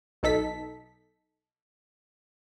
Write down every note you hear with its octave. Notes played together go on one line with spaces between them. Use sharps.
B1 D#4 A4 B6